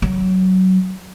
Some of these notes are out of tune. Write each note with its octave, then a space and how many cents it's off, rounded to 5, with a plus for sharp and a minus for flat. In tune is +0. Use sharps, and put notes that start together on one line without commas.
F#3 +15